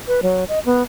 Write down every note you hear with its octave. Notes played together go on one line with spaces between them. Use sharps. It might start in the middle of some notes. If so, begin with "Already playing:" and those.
B4
F#3
D#5
B3